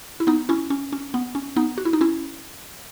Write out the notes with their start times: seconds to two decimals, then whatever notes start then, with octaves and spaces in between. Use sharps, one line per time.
0.20 E4
0.27 B3 D#4
0.49 C#4 E4
0.70 C#4
0.93 C#4
1.14 B3
1.35 C#4
1.56 B3 D#4
1.78 F#4
1.85 E4
1.93 D#4
2.01 C#4 E4